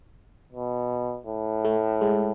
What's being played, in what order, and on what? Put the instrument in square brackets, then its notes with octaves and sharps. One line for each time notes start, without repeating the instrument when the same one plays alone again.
[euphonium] B2
A2
[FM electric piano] A3
G#3